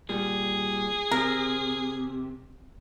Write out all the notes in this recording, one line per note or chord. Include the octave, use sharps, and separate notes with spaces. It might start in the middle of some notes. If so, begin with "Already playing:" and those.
A#2 G3 G#4
C3 A#4